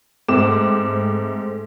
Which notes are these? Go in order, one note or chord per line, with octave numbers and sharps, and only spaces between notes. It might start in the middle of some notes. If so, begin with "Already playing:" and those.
G#2 A3 C4 D6 E7